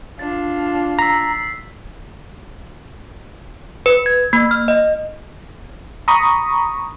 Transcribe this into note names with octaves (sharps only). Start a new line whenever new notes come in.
D4 F4 A6
A#5 E6 B6 C7
B4
G#6
A#3
F6
D#5
A#5 B5 C#6 D#6